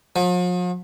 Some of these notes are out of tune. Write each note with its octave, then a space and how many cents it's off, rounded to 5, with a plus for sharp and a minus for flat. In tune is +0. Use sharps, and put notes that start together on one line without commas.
F3 +45